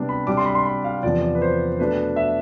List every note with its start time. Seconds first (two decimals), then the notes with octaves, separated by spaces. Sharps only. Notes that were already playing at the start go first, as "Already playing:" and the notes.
Already playing: C3 G3 B3 D4
0.09 B5
0.27 C3 G3 D4 D6
0.37 C6
0.45 B5
0.55 C6
0.65 B5
0.84 F5
1.03 E2 C3 F3 D5
1.22 D5
1.35 B4
1.42 C5
1.79 B2 A3 D4 B4
2.16 E5